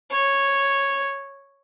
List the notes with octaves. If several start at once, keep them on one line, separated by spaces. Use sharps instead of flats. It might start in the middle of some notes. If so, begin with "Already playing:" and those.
C#5